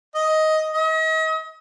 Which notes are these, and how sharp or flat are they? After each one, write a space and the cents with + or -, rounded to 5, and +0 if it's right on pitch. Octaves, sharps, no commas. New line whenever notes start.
D#5 +10
D#5 +40